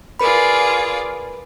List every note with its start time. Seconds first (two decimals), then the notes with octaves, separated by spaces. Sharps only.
0.20 F4 G#4 A#4 B4 D5 B5